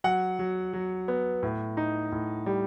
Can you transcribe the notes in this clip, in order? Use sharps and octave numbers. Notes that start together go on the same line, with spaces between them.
F#3 F#5
F#3
F#3
B3
A2
D#4
A2
G3